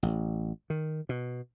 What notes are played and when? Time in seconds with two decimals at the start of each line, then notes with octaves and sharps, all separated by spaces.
0.03 A1
0.70 D#3
1.09 B2